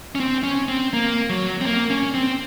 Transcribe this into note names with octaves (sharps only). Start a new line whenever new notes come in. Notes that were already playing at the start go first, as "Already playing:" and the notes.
C#4
C4
C#4
C4
A#3
F#3
C4
A#3
C#4
C4